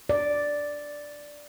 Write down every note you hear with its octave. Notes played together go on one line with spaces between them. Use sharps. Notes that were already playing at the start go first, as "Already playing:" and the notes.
D5